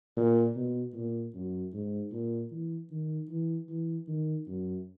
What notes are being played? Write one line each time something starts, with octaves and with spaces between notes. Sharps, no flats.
A#2
B2
A#2
F#2
G#2
A#2
E3
D#3
E3
E3
D#3
F#2